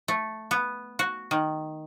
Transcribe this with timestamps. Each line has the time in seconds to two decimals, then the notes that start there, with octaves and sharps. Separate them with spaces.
0.08 A3
0.51 B3
0.99 F#4
1.31 D#3